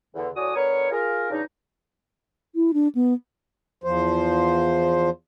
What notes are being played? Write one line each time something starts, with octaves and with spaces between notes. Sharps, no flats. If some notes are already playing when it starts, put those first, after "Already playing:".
E2 D3
A2 F#3 F#4 D5 G#5 D#6
D3 B3 A#4 B4 C#5
F4 G#4 A#4
E2 C#3 F#3 D4 D#4
E4
D4
B3
E2 F3 C5